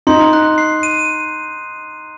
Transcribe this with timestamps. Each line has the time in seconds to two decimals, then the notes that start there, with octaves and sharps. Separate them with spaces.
0.07 D#4 C6
0.33 F#6
0.58 C7
0.83 D#7